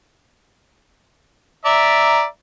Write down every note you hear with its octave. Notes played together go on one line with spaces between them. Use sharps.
D5 E5 A#5